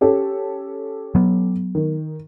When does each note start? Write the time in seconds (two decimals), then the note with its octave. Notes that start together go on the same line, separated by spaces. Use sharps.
0.01 C#4 G4 A4
1.15 F#3 B3
1.75 D#3